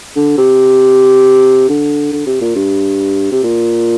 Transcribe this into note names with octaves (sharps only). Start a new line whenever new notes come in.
D3
C3
D3
D3
C3
A#2
G2
C3
A#2